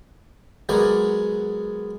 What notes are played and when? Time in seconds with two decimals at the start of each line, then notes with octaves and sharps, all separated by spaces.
0.69 F#3 G#3 B3 A#4 D5